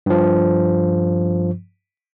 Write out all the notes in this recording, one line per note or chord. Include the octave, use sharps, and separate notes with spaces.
G2 F3